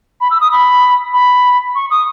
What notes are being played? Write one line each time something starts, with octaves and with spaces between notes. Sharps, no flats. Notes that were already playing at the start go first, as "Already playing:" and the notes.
B5
E6
D#6
B5
B5
C#6
D#6